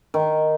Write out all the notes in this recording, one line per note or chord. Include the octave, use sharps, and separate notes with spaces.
D#3